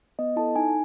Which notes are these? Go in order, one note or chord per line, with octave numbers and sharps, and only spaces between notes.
B3 D#5
E4 A4 A5
D#4 G#5